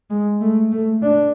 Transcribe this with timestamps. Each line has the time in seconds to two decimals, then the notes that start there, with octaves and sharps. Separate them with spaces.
0.10 G#3
0.41 A3
0.72 A3
1.02 D4